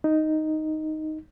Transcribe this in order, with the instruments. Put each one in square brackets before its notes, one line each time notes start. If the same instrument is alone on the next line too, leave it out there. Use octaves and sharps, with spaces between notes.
[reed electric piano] D#4